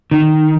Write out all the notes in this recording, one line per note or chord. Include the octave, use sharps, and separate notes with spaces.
D#3